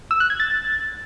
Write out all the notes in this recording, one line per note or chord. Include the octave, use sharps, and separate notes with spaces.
E6
F#6
G#6
A6